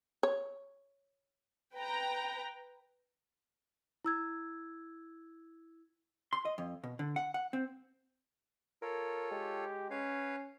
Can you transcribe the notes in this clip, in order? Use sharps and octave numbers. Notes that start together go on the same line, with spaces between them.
C#5
B4 G5 A#5
E4 E6 G#6
C6
D#5
F2
B2
D3
F#5
F#5
C4
F4 A4 A#4 C#5
G#3 G4
C#4 B4 C#5 F5